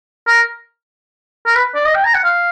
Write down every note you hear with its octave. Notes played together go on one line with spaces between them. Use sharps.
A#4
A#4
B4
D5
D#5
G5
A#5
F#5
F5